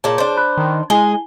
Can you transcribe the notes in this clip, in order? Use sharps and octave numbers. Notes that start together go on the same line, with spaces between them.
A#2 G#4 C#5 A5
D4 C5
B5 F#6
D#3
G#3 E4 G#4 G#5 G7